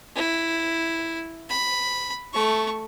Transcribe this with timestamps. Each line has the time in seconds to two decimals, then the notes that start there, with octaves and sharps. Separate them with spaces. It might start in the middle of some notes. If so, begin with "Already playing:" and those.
0.16 E4
1.50 B5
2.33 A3 C#6